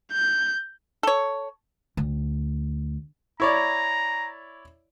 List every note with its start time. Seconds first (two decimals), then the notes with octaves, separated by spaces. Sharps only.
0.12 G6
1.03 A4 C#5
1.97 D2
3.40 E4 C#5 D5 A#5